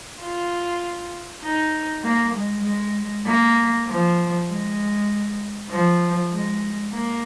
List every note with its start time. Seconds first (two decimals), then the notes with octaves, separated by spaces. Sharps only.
0.20 F4
1.43 D#4
2.04 A#3
2.35 G#3
2.64 G#3
3.26 A#3
3.87 F3
4.49 G#3
5.70 F3
6.32 G#3
6.93 A#3